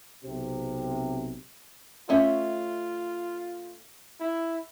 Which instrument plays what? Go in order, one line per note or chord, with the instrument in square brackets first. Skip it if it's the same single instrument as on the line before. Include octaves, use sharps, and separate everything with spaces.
[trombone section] B1 C3
[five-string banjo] A3 C#4 E5 [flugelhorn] F4
[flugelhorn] E4